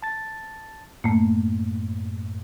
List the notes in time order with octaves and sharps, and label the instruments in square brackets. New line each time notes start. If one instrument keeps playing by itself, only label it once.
[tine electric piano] A5 A6
[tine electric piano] F#2 A2 [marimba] A3 A#3